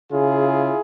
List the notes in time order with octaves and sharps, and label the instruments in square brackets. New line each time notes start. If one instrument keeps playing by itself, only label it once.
[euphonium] C#3 [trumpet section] E4 F4 G#4